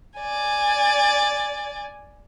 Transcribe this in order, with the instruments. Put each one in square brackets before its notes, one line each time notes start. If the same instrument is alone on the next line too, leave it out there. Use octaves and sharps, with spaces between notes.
[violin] D5 G#5